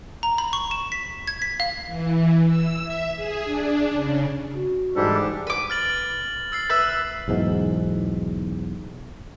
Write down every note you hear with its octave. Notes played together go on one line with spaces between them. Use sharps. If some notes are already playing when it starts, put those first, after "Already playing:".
A#5
B5
C#6
E7
B6
G#6
B6
F5
E3
E6
E5
G#4
D4
C#3
F#4
G#2 E3 G3 D4 G4 A4
B4 D6
F6 A6 F#7
E6 A6 C7
B4 E5
B1 E2 G#2